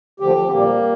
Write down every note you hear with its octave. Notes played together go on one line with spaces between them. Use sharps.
D2 D3 F3 G4
C4
A#2 G3 A#3